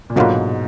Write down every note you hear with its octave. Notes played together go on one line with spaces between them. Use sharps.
A#2
G#2 B2 D3 F#3 A#3 F4 B4